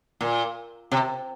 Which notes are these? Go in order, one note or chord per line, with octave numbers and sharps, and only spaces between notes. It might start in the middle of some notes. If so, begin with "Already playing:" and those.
A#2
C3